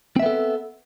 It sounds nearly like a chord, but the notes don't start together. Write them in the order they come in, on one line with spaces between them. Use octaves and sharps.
C4 E5 B3 A4